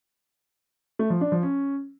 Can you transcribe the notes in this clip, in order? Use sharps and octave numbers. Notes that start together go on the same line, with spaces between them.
A3
F3
D4
F3
C#4